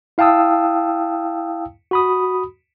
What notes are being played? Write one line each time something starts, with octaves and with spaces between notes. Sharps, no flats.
E4 F5 G5 A5 D#6 E6
F#4 B5 D#6